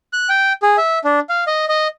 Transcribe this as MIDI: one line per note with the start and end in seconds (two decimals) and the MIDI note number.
0.13 0.29 90
0.29 0.53 79
0.63 0.77 68
0.77 0.99 76
1.04 1.20 62
1.29 1.44 77
1.47 1.65 75
1.69 1.88 75